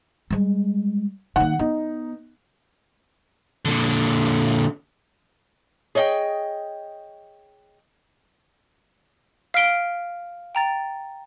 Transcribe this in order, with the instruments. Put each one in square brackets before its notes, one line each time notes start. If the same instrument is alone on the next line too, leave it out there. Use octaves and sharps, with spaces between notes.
[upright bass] G3 G#3
[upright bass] D#3 A#3 [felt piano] F#5
[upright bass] B3 [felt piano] D#4
[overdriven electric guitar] A#2 D3
[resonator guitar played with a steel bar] G#4 C#5 D#5 F5 G5
[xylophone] F5 F6 B6 D7 G7
G5 A#5 A6